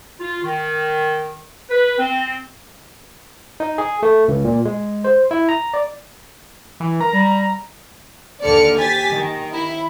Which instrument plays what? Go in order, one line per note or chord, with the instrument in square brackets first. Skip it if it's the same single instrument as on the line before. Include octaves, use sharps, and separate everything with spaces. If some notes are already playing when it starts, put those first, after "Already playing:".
[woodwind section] F4
D#3
B4
C4
[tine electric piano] D#4
G#4
A3
C#2
A#2
G#3
C5
E4
A#5
D5
[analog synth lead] E3
[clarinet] A#4 [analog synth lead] A#5
[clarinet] G3
[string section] D#2 D3 D5 F6 C#7
G4 G#5 A6 B6
D#3
E4